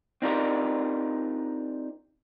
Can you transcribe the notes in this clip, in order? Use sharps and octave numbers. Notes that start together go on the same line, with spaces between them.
C4 D4 D#4 F4 G4 A#4